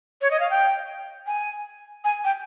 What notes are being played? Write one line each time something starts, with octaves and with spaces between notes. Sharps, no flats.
C#5
D#5
F5
G5
G#5
G#5
G5